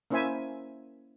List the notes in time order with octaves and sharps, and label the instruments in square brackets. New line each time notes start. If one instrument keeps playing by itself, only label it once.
[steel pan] A#3 C#4 E4 C5 E5 G#5